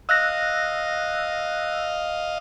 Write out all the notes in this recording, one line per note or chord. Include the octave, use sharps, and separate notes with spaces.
D#5 F5 E6 F#6 A#6